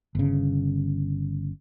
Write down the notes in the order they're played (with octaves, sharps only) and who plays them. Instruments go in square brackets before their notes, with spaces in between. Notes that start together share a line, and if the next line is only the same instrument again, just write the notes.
[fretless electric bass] G1 C#3